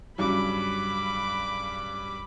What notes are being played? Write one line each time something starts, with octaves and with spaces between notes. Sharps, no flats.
G2 C#3 F#3 B5 D6